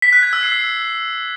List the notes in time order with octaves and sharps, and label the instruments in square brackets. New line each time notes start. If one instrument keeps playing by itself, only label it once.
[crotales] B6
F#6
G#6
E6
C7